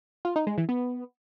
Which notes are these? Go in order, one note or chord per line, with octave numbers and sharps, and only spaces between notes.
F4
D#4
G#3
E3
B3